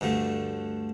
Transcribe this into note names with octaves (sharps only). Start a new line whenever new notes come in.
D2 G2 D3 A3